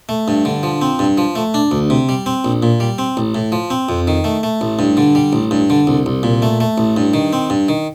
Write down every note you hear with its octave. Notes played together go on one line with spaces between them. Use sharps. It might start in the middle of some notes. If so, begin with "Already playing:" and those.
A3
G2
D3
F3
C4
G2
F3
A3
D4
D2
C3
G3
C4
A#1
A#2
G3
C4
A1
A2
F3
C4
F2
D#3
A3
A3
A1
G2
D3
G3
A1
G2
D3
C2
C2
A#2
A3
A3
A1
G2
D#3
C4
G2
D#3